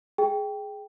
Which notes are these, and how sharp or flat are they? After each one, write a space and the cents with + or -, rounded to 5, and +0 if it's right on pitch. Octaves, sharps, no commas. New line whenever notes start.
G#4 +10 G5 +0